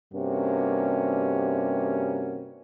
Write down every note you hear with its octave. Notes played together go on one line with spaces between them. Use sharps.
G2 C3 A#3 C#4 F#4